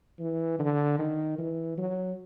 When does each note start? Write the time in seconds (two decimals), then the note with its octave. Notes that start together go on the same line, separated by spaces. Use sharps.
0.19 E3
0.59 D3
0.99 D#3
1.39 E3
1.78 F#3